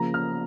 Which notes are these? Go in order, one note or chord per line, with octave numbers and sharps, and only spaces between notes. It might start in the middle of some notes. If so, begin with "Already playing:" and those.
Already playing: C#3 F3 A#3 A#5
F6